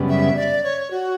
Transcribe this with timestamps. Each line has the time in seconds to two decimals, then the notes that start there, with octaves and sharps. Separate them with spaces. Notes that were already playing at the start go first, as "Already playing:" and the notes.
Already playing: F#2 C#3 G3 B3
0.09 E5
0.36 D5
0.64 C#5
0.91 F#4